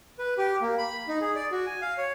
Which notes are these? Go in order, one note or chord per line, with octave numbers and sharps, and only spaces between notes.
B4
G4
A#3
B5
D#4
G#4
D5
F#4
G#5
F5
C#5